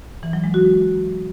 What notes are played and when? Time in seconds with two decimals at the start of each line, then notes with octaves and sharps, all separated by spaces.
0.23 E3
0.33 F#3
0.44 G#3
0.54 F#4